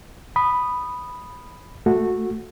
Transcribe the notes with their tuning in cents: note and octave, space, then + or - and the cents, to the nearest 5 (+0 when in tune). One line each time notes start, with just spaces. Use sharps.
B5 +0 D#6 -10
A3 +0 F#4 -15